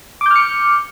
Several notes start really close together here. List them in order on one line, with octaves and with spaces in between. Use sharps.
D6 G6 F6 C#7